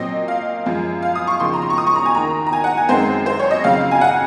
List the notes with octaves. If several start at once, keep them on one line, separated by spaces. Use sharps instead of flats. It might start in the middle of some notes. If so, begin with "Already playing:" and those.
Already playing: A#2 F#3 C4 D#5
F5
F#2 F3 G#3
F5
D#6
C#6
D#2 C#3 F3 C6
A#5
C6
C#6
D#6
C#6
A#5
G#5
D#2 D#3 A#3 A#5
A#5
G#5
F#5
G#5
F#2 D#3 G#3 C4 C5
C5
C#5
D#5
F2 C#3 F#3 C4 F5
G#5
F#5